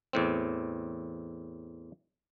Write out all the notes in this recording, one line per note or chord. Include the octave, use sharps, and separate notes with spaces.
E2 A2 C4